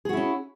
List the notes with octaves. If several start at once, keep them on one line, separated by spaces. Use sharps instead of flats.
C#4 E4 F#4 G#4